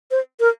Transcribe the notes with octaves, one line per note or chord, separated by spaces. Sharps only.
C5
A#4